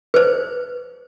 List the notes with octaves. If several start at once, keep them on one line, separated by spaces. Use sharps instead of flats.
B4 C5